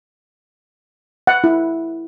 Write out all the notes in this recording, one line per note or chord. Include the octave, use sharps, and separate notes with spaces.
F#5
E4